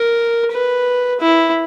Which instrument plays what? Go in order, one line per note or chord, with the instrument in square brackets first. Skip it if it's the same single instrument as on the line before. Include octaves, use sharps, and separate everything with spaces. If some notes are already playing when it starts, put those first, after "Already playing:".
Already playing: [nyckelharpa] A#4
B4
E4